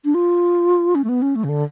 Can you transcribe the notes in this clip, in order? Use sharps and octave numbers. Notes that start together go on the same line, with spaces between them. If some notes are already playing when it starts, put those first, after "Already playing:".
D4
F4
C#4
A3
B3
C#4
A3
C#3
D3